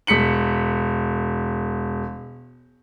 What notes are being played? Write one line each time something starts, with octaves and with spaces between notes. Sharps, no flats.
E1 B6 C#7 F#7